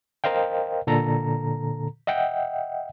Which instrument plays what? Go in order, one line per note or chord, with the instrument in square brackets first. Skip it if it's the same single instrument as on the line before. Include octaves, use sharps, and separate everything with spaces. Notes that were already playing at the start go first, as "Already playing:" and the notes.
[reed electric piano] A#4 C5 D#5 F5 G5
A#2 D3 A4 A#5
D#5 E5 F#5 G5